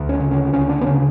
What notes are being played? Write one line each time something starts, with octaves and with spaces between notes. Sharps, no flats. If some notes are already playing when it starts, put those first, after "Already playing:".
Already playing: D2
C#4
C#3
C#4
D2 C#4
D4
B3
C#3 C#4